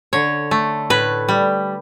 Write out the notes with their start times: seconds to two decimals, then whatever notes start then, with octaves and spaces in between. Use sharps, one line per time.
0.13 D3 C#5
0.51 A3
0.90 A2 B4
1.29 G3